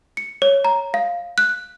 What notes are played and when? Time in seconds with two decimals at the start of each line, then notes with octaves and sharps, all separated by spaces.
0.17 C#7
0.42 C#5
0.65 A#5
0.94 F5
1.38 F#6